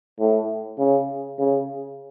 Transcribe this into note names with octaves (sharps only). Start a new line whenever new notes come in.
A2
C#3
C#3